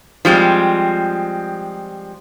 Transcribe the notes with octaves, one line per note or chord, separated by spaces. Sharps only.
F3 G3 G#3 C4